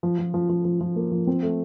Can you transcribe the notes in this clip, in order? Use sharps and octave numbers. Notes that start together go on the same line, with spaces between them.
F3
F3
F3
F3
F3
F3
A#3
F3
C4
A3